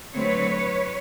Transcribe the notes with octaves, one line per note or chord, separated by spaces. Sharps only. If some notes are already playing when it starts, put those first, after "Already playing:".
D3 F#3 A3 C4 B4 C#5